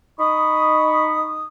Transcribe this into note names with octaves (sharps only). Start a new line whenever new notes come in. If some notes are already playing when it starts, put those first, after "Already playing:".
D#4 B5 C#6 D#6